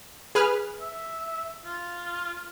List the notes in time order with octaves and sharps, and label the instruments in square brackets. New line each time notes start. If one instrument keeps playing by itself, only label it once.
[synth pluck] G#4 B4 F6
[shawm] E5
F4